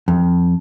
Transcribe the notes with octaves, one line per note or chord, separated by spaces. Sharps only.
F2